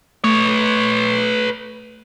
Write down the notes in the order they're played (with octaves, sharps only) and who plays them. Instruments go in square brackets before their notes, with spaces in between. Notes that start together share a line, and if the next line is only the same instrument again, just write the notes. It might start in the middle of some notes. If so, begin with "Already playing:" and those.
[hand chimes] A3 [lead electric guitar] B4 C#5